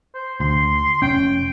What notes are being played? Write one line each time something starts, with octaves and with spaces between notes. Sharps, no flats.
C5
D2 C6
F1 C#4 G5